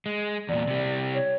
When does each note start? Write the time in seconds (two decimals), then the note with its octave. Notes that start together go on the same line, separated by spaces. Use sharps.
0.06 G#3
0.49 E2 A#2 D5
0.67 C3 G3
1.14 C#5